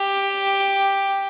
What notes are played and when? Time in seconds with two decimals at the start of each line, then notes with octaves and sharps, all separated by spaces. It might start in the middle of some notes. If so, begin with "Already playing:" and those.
Already playing: G4